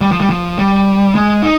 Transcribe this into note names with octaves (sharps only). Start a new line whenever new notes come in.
G3
F3
G3
F3
G3
G#3
D#4